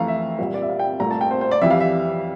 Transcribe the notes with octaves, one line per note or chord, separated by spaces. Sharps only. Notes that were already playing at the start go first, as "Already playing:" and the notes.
Already playing: F2 E3 A3 F5 A#5
E5
C2 A#2 G3
D5
E5
F5
G5
C2 A#2 A3 A#5
A5
G5
C5
C5
D5
F2 E3 G3 E5
F5
E5